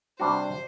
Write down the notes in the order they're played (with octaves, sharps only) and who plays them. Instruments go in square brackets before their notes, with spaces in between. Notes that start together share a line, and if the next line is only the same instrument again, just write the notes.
[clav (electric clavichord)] C3 G3 D4 F#4 [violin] C5